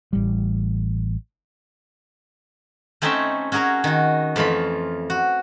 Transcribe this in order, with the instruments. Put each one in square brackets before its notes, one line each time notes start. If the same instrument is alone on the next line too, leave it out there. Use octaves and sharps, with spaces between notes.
[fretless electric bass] A1 G3
[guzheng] A3 C4 C#4 D#4 E5 G5
C#4 F#4 G#4 A#4 C#5
D#3 F#4
F2 E3 A3 F4 B5
F#4